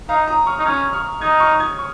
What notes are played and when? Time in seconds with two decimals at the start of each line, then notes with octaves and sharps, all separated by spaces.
0.09 D#4 F5 A#5
0.27 A#5 D#6
0.46 C#6 F6
0.59 D#4
0.66 C#4 C#6 F6
0.93 C#6 F6
1.21 D#4 D#6 G#6
1.40 C#6 F6
1.59 D#6 G#6
1.78 C#6